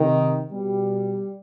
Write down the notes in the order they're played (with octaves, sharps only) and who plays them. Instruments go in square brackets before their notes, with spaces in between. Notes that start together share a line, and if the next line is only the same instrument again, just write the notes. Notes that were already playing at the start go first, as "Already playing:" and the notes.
Already playing: [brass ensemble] C3 D#3
B2 G3